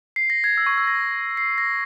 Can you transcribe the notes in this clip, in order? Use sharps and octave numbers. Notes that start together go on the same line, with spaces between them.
C7
A#6
G#6
E6
C#6
E6
A#6
C7
A#6